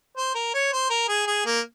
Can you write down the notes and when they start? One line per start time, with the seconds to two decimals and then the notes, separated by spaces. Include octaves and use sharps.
0.17 C5
0.34 A#4
0.54 C#5
0.73 C5
0.90 A#4
1.08 G#4
1.27 G#4
1.46 A#3